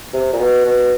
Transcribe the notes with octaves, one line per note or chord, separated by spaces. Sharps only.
C3
A#2
B2
B2